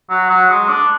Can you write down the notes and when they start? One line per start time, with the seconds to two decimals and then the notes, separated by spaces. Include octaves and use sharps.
0.10 F#3
0.30 F#3
0.50 G#3
0.69 D4